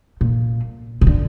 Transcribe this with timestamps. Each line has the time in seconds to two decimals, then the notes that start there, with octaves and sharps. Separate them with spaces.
0.21 A#2
1.01 C3
1.07 D3